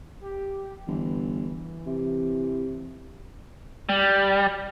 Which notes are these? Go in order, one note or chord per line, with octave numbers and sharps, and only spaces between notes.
G4
G1 E3
C3
G3